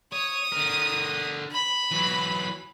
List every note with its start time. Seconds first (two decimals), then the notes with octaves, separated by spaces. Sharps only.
0.12 C#5 D#6
0.52 D3 A#4
1.51 B5
1.91 E3 F#3